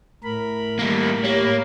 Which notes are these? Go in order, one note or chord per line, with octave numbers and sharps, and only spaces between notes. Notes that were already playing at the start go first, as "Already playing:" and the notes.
A2 A#4 B5
G3 A#3
A#3 G4 C#5